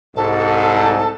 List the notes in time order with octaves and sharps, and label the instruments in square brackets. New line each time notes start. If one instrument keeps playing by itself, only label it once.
[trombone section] C2 G#2 [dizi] A4